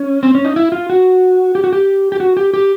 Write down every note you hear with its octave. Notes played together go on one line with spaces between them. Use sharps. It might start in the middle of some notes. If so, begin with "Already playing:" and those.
Already playing: C#4
C4
C#4
D#4
E4
F4
F#4
G4
F#4
G4
G4
F#4
G4
G4